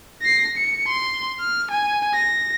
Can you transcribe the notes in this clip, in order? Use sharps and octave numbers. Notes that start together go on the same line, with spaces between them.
A#6 C7
C#7
C6
F6
G#5
A#6